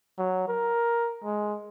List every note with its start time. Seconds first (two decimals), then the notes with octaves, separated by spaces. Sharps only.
0.18 F#3
0.48 A#4
1.24 G#3